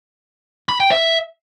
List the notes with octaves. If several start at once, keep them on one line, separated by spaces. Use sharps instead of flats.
B5
G5
E5